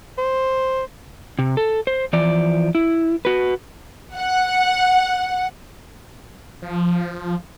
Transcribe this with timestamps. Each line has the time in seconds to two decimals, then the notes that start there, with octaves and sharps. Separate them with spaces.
0.18 C5
1.39 C3
1.57 A4
1.87 C5
2.13 E3 F3 D5
2.75 E4
3.25 F#4 B4
4.15 F#5
6.62 F3